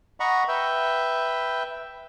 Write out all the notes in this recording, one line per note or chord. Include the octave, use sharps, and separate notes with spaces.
D#5 F#5 A#5 B5 C#6
B4 E5 G5